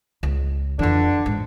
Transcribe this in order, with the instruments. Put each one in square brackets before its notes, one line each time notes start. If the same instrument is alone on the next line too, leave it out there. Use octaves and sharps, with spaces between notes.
[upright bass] C#2
[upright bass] F2 E3 [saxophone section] D3 D4
[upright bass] G#2